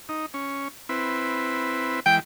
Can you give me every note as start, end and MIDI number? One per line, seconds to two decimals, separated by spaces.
0.09 0.26 63
0.34 0.68 61
0.89 2.00 60
0.89 2.00 64
0.89 2.00 71
2.06 2.20 52
2.06 2.20 56
2.06 2.16 79